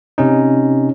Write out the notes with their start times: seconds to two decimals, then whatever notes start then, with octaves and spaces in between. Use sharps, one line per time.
0.18 C3 C#4 D#4